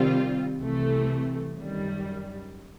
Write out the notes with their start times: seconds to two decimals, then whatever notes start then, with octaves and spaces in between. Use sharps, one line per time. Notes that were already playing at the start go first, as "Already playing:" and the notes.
Already playing: C3 D#3 G3 C4 F4
0.59 C2 C3 E3 A3
1.58 F#2 D#3 G3